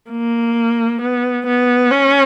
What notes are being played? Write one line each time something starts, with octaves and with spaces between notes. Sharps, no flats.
A#3
B3
B3
C#4